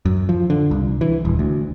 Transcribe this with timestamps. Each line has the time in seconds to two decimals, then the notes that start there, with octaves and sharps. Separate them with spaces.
0.05 F#2
0.29 F3
0.50 D3
0.71 C2
1.01 E3
1.25 D#1
1.39 D2